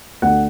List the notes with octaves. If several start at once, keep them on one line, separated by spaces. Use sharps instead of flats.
D2 D3 A3 F#5